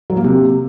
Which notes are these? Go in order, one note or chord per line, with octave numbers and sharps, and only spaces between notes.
F#3
A#3
C3